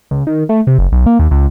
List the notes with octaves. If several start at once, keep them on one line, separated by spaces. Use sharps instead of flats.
C#2
D#3
A3
C3
F#1
B1
A#3
D#2
C#2